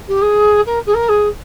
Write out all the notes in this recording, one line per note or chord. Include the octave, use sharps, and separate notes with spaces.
G4
G#4
A#4
G#4
A#4
G#4